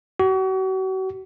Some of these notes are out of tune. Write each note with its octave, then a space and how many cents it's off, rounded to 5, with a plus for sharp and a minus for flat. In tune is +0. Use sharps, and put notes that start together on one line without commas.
F#4 +40